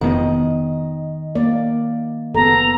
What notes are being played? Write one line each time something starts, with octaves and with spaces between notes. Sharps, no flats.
F1 D#3 B3 D#5
A#3 D5
F#1 B3 A4 A#5